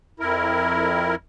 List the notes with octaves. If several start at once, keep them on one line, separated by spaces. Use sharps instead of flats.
F2 E4 A#4